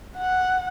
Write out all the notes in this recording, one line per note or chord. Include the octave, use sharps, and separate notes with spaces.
F#5